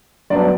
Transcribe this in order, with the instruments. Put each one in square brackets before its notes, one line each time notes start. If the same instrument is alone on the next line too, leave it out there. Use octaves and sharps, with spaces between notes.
[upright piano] G2 F#3 B3 D4 D5